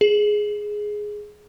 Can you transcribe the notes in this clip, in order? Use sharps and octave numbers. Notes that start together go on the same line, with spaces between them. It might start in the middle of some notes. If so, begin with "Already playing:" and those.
G#4